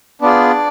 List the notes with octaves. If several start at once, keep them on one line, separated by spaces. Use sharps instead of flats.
B3 D4 F4 G#4 D5